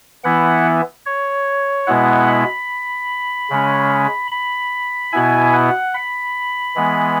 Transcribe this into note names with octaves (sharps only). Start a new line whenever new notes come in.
E3 B3 E4 F#5
C#5
B2 G#3 B3 E4 F#5
B5
C#3 G#3 C#4
B5
B2 B3 E4 G#5
F#5
B5
E3 G#3 B3